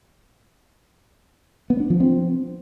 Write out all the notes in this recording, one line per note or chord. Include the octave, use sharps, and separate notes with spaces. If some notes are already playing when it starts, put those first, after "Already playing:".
B3
D4
F3
C4